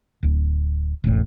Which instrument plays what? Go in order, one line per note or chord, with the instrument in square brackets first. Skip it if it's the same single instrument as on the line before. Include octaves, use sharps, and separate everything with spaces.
[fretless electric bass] D1 D2
E1 A1 A2